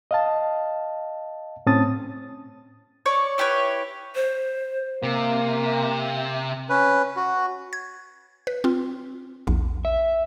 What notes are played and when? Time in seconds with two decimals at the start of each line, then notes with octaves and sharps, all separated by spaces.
0.11 D#5 F5 A5
1.66 A2 C4 C#4 A5 D#6 A6
3.06 C#5 D5 C#6
3.38 E4 G4 B4 C#5
4.15 C5
5.03 C3 A#3
6.69 C#4 B4
7.16 F#4
7.73 G#6
8.47 B4
8.64 C4 F4
9.47 A#1 E2
9.85 E5